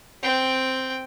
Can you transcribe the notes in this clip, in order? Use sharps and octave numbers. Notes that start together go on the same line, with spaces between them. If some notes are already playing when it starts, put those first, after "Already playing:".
C4 G5